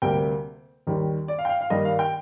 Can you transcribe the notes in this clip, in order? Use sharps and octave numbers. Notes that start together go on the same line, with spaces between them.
D2 C3 G3 A#3 G5
D#2 D#3 G3
D5
F5
G5
F5
F5
G2 D#3 G3 A#3 D#5
F5
G5